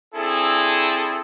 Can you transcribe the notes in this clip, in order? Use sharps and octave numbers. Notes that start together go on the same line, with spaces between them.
C4 D4 E4 G#4 A4